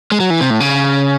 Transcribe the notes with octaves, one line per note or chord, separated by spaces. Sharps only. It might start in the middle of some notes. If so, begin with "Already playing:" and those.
G#3
F#3
E3
C3
A2
C#3